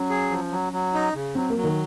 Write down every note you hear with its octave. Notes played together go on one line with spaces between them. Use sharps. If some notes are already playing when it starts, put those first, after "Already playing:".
Already playing: F#3 C#4
G#4
F3
F#3
F#3
D#4
C#3
F#3 C4
A#3
F#3
D#3